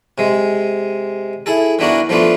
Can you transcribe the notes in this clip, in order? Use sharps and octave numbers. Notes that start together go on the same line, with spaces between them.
C3 G#3
E4 G#4 A4
E3 B3 D4 F#4 A#4
F3 A3 B3 D4 F4